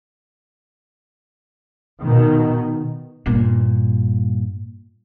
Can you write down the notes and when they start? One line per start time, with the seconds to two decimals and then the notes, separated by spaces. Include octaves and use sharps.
2.01 B2 D#3
3.26 G2 A#2